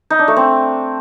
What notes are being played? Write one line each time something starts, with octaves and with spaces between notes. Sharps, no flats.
D#4
D4
A3
C4